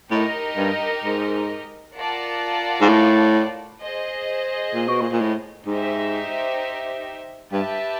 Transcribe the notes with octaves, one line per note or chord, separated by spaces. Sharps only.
A2 D#4 G4 A#4 D#5
G2
G#2
F4 A#4 D5 F#5 A5
G#2
A2
G#4 C5 D#5
A#2
B2
A#2
A#2
A2
G#2 D#4 G4 C5 E5
G2 G4 B4 E5 A5